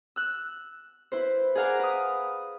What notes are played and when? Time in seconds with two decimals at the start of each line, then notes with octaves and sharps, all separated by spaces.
0.16 E6 F#6
1.12 E4 B4 C5
1.55 G#4 A#4 D5 F5 F#5 A#5
1.79 B4 D#6